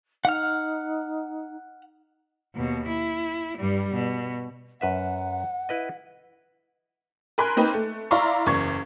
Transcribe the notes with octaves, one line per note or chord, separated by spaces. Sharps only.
D#4 F#5 F6
D#2 B2
E4
G2 G3
B2
F#2 B4 E5 F#5
E4 B4 D#5
A#4 G#5 B5 C6 F#6
A#3 C4 D#4 B4
A3
E4 D5 F5 A#5 C6 C#6
F#1 E2 C#6 G#6